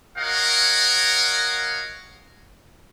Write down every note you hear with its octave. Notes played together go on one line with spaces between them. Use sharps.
F#4 A#4 C#5 D#5 F5 F#5